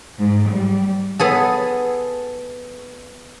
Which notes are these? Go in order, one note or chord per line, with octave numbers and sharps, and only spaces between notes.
G#2
G3
B3 G#4 A4